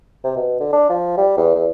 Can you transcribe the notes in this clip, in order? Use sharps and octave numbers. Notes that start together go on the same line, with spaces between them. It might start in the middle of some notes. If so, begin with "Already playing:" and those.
C3
B2
D3
D4
F3
G3
E2
E2